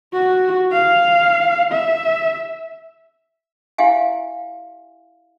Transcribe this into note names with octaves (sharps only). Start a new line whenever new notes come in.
F#4
F5
E5
E4 G4 E5 F5 G#5